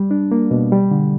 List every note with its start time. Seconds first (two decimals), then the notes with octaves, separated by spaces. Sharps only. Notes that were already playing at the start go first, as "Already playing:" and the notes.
Already playing: G3
0.11 D4
0.32 A#3
0.51 B2
0.72 G3
0.91 D3